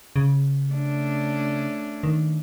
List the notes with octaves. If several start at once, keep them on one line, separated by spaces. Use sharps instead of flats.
C#3
A3 C#4 D4
D#3